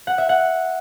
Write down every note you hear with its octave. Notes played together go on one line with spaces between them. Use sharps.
F#5
E5
F#5